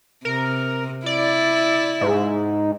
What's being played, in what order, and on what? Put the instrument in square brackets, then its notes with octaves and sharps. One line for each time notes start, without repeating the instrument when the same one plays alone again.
[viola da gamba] C3 [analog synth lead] A#4
[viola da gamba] E4 [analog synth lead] D5
[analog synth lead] G#2